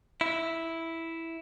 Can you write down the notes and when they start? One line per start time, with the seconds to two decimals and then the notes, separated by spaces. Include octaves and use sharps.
0.21 E4